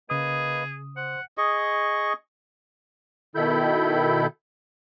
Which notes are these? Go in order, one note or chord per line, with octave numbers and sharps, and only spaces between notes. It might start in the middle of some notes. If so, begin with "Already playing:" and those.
C#3 A#3 G#4 B4 D#5 D#6
C5 F#5
G#4 D#5 C#6
B2 D#3 E4 A4 B5 G6